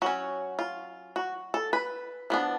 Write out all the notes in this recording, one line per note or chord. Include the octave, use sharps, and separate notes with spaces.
F#3 C#4 F#4
F4
F#4
A4
B4
F3 B3 D4